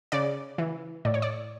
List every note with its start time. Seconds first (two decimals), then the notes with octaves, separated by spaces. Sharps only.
0.12 C#3 D5
0.58 E3
1.05 A2 D5
1.14 C#5
1.22 D5